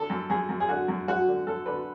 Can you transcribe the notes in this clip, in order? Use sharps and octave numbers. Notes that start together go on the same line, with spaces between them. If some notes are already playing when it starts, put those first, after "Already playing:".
Already playing: D3 A4
F#2
F#2 G#4
F#2
G#4
D3 F#4
F#2
F#2 F#4
D3
F#2 A4
D3 B4